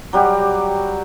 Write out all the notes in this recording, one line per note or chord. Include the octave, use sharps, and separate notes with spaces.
F#3 G3 F#4 G4